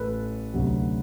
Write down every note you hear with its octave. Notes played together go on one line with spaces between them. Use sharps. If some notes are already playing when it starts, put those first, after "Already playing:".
Already playing: A1 A2 A4 B4
D2 C3 F#3